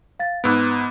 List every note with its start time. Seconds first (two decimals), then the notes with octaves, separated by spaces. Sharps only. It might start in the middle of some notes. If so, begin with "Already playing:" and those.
0.19 F5 A6
0.44 G#2 B3 E6 F#6 D7